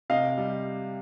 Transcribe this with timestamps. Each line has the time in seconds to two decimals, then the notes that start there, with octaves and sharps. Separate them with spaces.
0.10 C3 D#5 F5
0.38 G3